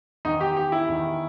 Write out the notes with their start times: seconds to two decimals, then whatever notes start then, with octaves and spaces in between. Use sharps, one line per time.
0.25 E2 D#3 D#4
0.41 G4
0.57 G4
0.72 E4
0.88 E2 D#3